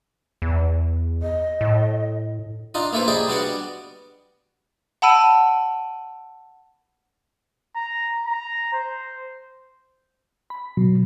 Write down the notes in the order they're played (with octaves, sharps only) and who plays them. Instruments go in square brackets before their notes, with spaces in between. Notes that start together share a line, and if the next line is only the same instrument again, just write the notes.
[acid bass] E2
[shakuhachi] D#5
[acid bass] A2
[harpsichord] D4 D#4 F4 D#5
A#3 E4 A4 B4 C5
E4 G4 G#4 D5 D#5
G3 B3 D4 F#4 D5 F#5
[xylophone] F#5 A5 B5 E6 D7 D#7
[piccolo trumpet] A#5
A#5
C5
[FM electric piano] B5
[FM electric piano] B2 [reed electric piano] F#3